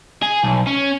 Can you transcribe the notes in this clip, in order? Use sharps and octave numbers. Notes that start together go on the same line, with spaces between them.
G#4
B1
C#4